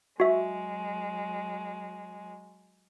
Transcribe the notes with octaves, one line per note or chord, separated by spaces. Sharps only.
F#3 G#3 F#4 E5